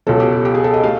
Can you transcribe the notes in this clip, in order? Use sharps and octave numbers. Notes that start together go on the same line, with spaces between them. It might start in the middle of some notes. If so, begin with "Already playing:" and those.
C#2 B2 F#3 A4
G4
G4
G4
G#4
A4
D#5
A3 F5